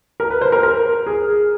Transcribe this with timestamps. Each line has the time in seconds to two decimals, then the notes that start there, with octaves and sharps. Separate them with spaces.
0.20 A#4
0.30 B4
0.41 C5
0.52 A#4
0.63 A#4
1.06 G#4